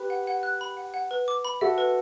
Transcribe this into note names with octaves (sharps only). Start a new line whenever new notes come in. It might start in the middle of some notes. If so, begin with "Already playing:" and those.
Already playing: G4 B4
F#5
F#5
F#6
B5
F#5
F#5
B4
D6
B5
F#4 A4 E5
B4